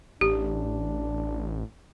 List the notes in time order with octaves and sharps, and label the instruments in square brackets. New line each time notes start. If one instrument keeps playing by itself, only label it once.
[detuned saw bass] A1 [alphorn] D4 [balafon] G4